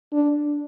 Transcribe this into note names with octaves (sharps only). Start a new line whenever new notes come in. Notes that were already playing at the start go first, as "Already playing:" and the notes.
D4